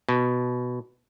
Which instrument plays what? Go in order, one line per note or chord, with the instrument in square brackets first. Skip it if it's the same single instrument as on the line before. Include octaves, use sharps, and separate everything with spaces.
[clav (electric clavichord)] B2